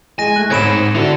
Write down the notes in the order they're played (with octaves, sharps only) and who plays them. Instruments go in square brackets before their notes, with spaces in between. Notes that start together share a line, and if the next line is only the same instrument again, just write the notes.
[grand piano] G#3 [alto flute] E4 [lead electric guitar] G#5 [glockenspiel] A#6 D#7
[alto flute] A3 [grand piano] F#6
[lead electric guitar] C2 G#2 [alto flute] C4 [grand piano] C#5 B5 [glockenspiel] G#6 D7 E7
[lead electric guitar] D3 D4 [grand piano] E4 [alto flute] F#4